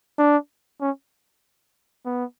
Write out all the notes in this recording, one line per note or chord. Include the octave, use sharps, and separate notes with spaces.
D4
C#4
B3